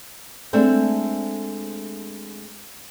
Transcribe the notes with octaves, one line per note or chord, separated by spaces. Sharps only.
G#3 A3 C4 D4